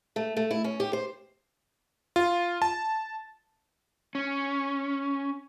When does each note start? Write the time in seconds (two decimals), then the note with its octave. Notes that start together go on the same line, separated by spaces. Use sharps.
0.16 A3
0.37 A3
0.51 E4
0.64 C#4
0.80 G4
0.93 C5
2.16 F4
2.62 A5
4.15 C#4